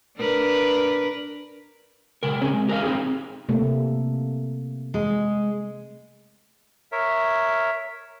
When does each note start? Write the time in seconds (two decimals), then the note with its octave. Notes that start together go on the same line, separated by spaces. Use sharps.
0.18 D4 A#4 B4
2.23 C#3 G#3 A#4
2.41 C4 C#4 G#4
2.54 G#3
2.68 G4 A#4 C#5 D#5 F5
2.83 C4 D#4 F4 G4 G#4
3.49 C3 A3 A#3
4.94 G#3
6.92 A#4 C#5 E5